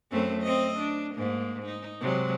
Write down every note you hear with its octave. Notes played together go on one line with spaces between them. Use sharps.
F#2 A3 C4
C4 D#5
D4
G#2 A#3
D#4
C3 F#3 G#3